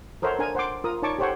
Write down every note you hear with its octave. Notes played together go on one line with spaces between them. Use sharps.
A4 A#4 C5 C#5 E5 F#5
D4 A#4 G#5
C5 F#5 C6 D6
F4 A#4 D#6
D#4 C#5 D5 A5 C#6 D6
G4 A4 C5 C#5 F#5 G5